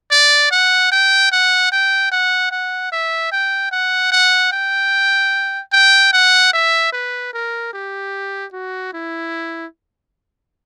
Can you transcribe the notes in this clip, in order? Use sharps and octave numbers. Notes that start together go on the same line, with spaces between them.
D5
F#5
G5
F#5
G5
F#5
F#5
E5
G5
F#5
F#5
G5
G5
F#5
E5
B4
A#4
G4
F#4
E4